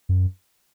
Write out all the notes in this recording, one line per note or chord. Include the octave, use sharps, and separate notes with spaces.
F#2